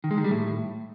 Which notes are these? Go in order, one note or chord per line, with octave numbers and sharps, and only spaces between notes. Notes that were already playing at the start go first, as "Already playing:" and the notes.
D#3
G#3
D#3
G3
A2